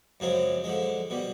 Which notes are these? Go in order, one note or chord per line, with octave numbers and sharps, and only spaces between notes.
F#2 C#3 F3 G#3 C4
D3 F3 G#3
B2 G3